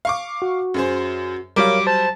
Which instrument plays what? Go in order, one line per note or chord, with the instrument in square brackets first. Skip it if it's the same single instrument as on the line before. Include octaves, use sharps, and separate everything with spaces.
[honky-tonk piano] F5 C#6 D6
[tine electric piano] F#4
[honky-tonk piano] F#2 G#4 C5
[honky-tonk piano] F#3 G3 [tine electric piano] A#4 C#5 F5 [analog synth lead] D6
[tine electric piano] C5 [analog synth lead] A5